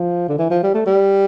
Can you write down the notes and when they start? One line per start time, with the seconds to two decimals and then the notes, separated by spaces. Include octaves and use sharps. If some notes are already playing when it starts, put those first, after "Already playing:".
Already playing: F3
0.29 D3
0.38 E3
0.50 F3
0.63 G3
0.74 A3
0.86 G3